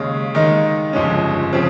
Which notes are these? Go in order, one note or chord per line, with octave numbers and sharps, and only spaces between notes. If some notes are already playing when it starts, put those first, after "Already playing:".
Already playing: D#2 C#3 G#3
D#2 D#3 G#3 D#4
G1 F2 C#3 G#3 C#4
C#3 F3 C4